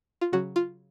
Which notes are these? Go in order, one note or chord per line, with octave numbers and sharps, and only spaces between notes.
F4
C#3 F#3 C#4 F#4
F4